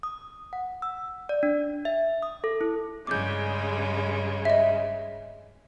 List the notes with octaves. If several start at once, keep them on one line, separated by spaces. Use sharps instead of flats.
D#6
F#5
E6
D5
D4
E5
D#6
A4
E4
G2 C#3 G#3 D6 G6
D#5 E5